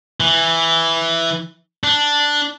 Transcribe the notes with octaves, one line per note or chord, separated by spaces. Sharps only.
E3
D4